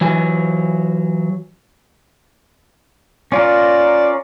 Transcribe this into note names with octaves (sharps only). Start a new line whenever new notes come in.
E3 F#3 G#5
C#4 F4 A#4 D5